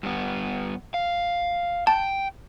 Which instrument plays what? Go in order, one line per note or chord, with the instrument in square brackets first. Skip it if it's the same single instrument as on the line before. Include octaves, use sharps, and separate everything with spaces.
[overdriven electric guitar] G2 B3
F5
[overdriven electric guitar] G5 [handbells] A5